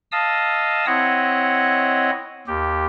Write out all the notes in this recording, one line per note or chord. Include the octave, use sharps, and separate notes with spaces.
D#5 F5 A5 D#6 E6
C4 E4 C#5 D#5 F#5
D#2 G4